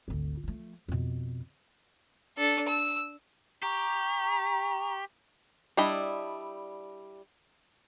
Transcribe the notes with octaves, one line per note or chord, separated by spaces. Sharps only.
G#1 D2
F3 A3
F2 B2
D4 A4
E6
G4 A#5 C#6
G3 D4 E4 D#5 B5